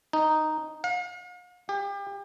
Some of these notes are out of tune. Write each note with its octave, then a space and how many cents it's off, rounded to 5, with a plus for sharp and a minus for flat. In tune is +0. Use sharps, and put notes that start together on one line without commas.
D#4 -5
F5 +45
G4 +35